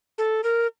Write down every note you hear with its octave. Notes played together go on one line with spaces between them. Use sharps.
A4
A#4